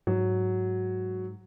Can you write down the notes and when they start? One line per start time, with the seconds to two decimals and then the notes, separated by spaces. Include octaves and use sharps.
0.07 G#2 F#3